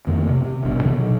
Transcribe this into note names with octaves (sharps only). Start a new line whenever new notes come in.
F2 D#3 A3 A#3
C3
C3
G#1 G2 B2 D4
C3 D#3 E3 B3
B2 F#3